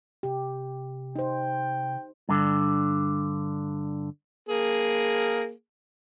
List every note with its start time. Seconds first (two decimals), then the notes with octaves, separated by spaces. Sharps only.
0.23 C3 G4
1.16 D#4 C5 G5
2.29 G2 D3
4.49 A#3 G#4